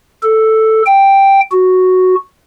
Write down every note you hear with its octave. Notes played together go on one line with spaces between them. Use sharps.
A4
G5
F#4